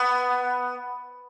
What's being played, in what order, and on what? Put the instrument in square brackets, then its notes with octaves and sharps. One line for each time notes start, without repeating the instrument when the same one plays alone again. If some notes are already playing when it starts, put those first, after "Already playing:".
Already playing: [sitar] B3